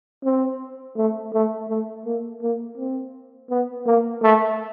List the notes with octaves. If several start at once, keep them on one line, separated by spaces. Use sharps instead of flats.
C4
A3
A3
A3
A#3
A#3
C4
B3
A#3
A3